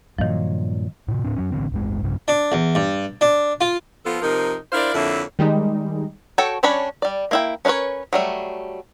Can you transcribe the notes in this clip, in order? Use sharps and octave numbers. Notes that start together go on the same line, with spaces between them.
G2 A#2 D#3 F3 F#3
A2 C3
A2 C4 D4
F#2 F#3 C#4
A1 A2 D3 C4
D1 G1 G#3
B1 G2 C#3
D4
E2
G2
D4
F4
F3 B3 F4 A4
C3 F3 D#4 A#4
D4 E4 A#4 C5 D5 F5
F2 D3 A#3 E4 C#5 E5
D#3 G3 G#3 D#4
F#4 A4 C#5 G5
G3 C#4 D4 C#5 B5
G3 D5
A#3 E4 G5
C#4 D4 A#4 B4 C#5
F#3 G3 A3